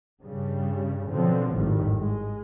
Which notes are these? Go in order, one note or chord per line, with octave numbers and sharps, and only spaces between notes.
G2 C#3 G3
B2 D3 F3 F#3 C4
G#1 F2 A2 D#3 G3
G#3